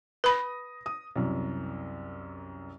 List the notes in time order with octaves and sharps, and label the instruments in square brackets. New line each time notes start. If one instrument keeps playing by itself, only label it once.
[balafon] B4 B5 [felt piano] D#6 A#6
[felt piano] D#6
C2 F#2